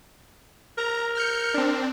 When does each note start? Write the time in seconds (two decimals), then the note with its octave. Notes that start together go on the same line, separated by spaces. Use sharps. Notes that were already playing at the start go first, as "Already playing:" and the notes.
0.78 A#4 A#5
1.15 F6 G6 C#7
1.54 C4 D4